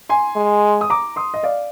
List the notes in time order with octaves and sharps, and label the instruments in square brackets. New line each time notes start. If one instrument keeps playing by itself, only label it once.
[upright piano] G#5 C6
[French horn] G#3
[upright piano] D#6
A#5 D6
C6 D#6
D#5
D5 F5